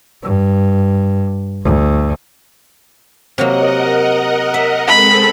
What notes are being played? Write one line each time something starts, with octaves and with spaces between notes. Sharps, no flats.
G2
D2
C3 F#3 A#3 A#4 D#5 F#5
E5
G#3 C4 A4 B5